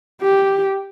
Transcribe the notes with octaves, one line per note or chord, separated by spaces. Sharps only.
G4